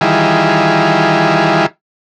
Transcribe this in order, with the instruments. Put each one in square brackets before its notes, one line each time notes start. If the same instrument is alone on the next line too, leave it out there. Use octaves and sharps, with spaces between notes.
[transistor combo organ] D#3 E3 G3 E4 F4 G#4